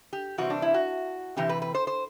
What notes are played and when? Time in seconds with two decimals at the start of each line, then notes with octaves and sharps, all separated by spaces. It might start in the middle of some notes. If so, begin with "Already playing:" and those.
0.13 G4
0.38 C3 E3 G3 C4 F#4
0.50 D4
0.62 E4
0.74 F#4
1.37 C3 E3 C4 G4
1.49 B4
1.62 B4
1.75 C5
1.87 C5